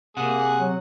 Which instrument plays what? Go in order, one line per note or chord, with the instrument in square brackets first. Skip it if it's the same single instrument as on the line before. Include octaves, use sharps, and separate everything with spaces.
[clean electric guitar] C3 [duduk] A#3 [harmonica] G#4 G#5 [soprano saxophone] F#5
[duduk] F#3